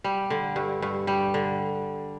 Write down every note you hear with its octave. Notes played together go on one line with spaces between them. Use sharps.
G3
D3
G2
G2
G3
D3